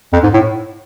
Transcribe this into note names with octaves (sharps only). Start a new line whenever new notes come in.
F2
G#2
A2